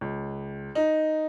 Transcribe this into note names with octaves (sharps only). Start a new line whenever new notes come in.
C#2
D#4